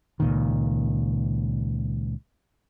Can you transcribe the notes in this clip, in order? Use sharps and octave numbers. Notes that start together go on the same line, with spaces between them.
C#2 A#2 D#3